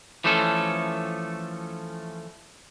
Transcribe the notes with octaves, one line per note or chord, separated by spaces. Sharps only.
E3 F3 A3 C#4 A4